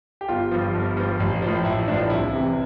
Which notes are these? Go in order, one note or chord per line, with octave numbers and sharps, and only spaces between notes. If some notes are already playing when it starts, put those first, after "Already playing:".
G4
G1 F4
G2 F3
G1
G2 F3
A1
A2 F3
A1 E4
A2 F3 D4
C2 E4
C3 E3